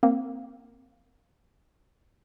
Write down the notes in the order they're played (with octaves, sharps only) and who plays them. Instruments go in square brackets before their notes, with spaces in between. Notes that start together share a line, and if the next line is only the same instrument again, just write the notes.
[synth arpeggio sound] A#3 C4